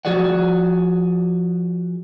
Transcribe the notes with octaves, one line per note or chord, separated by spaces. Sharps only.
F3 F#4 G#4 D5 F#5